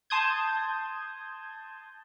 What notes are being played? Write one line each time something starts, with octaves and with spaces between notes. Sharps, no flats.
A5 C6 D#6 G6 G#6